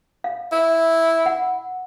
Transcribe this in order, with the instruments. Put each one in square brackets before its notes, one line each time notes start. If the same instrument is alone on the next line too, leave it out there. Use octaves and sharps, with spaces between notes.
[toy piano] F5
[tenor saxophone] E4
[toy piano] F#5